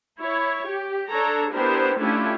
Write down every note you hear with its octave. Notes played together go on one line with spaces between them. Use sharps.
E4 C#5
G4
D4 A4 C#5 A#5
B3 D4 E4 G4 A#4 C5
A3 C#4 D4 E4 F4 G4